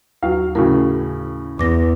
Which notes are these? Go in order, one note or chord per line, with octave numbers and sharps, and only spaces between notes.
D#2 F#3 F5
A2 C#3 F#4 A#4
E2 D6 A#6